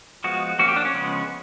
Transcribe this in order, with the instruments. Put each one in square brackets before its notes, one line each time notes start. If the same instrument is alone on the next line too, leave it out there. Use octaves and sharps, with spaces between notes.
[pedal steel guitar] F3 G#3 B3 F#4
F3 A#3 C#4 F#4
G4
D4
C#4
C#3 F3 G#3 B3